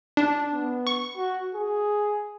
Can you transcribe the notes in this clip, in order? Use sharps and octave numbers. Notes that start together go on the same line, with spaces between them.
D4
B3
C#6
F#4
G#4